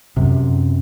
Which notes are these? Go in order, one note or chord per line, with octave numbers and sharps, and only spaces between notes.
F#2 C3